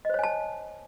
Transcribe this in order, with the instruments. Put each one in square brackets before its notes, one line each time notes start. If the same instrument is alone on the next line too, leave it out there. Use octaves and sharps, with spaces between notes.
[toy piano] D#5
C5
C#5
G#5
A5